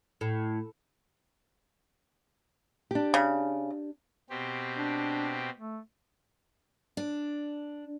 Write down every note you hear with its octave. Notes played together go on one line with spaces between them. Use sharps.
A2
D4 G4
C#3
B2 C4 G4
D4
A3
D4